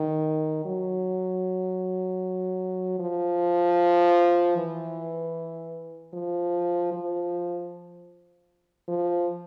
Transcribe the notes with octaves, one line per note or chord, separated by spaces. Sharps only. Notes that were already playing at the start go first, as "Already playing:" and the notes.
Already playing: D#3
F#3
F3
E3
F3
F3
F3